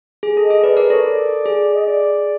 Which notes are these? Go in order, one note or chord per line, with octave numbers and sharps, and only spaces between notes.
G#4
A4
D#5
G#4
B4 D5
A#4 D5
A4 C#5
D5
G#4
D#5
D5